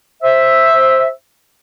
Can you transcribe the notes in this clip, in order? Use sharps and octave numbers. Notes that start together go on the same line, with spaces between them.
C5 E5